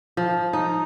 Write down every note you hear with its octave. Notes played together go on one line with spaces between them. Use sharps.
F3
D#4